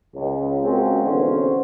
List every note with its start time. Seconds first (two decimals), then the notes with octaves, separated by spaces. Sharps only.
0.14 C#2
0.63 G#3 A#3 C4 C#4 F4 F#4
1.02 B1 E2 D3 C#4 F#4 C5